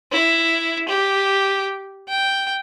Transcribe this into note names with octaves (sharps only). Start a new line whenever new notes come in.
E4
G4
G5